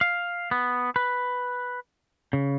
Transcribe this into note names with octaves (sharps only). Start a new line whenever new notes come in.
F5
B3
B4
C#3